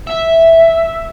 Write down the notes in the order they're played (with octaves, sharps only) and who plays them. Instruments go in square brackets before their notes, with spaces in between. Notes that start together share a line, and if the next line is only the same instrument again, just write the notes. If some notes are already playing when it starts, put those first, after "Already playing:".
[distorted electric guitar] E5